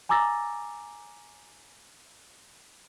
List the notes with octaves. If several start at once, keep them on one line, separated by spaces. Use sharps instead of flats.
G#5 A#5 D6 E6 A6 A#6